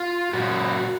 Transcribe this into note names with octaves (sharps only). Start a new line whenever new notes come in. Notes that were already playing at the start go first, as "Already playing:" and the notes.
Already playing: F4
A#2 F#3 C#4 F#4